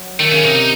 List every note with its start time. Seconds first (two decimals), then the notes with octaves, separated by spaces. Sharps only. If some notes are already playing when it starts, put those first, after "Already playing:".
Already playing: F#3
0.19 D#3 A3
0.31 C#3 C#4
0.43 C3 D#4
0.56 D#4